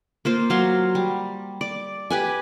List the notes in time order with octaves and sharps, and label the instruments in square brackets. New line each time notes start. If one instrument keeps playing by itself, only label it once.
[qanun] A#3 F4 C5
F#3 F5 C6
G3
D5
G4 B4 G#5